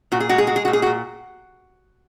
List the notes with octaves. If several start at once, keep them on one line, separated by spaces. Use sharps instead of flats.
A#2 F#4
G#4
G#3 F#4
G#4
G#3 F#4
G#4
A#2 F#4
G#4
F#4
A#2